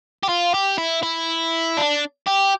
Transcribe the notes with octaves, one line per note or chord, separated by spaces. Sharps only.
G4
F4
G4
E4
E4
D4
G4